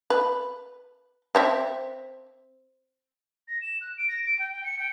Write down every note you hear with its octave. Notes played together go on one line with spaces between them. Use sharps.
B4
C4 C5 E5
A#6
E7
F#6
D7
A#6
D7
G5
G5
C#7
G5